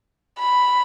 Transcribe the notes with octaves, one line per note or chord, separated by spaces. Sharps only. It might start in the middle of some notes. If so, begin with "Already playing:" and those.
B5